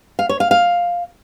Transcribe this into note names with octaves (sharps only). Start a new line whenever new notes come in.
F5
C#5
F5
F5